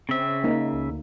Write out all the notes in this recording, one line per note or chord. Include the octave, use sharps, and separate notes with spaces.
C#3 C4 E5
A#3 D#4
C#2
D2